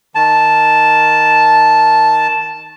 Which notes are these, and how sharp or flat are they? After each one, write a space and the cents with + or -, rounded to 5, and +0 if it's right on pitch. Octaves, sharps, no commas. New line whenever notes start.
D#3 +0 A5 -5